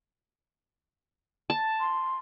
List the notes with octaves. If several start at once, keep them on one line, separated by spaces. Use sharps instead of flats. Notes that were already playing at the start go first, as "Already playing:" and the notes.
A5
C6